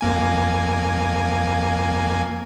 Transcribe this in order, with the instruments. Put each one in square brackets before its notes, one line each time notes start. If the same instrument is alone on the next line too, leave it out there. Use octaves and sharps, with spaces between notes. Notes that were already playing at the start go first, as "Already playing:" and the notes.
[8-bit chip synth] F2 A#3 G#5